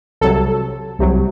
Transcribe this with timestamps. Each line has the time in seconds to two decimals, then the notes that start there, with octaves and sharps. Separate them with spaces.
0.21 C2 C3 F#3 A4
0.99 C2 C3 F#3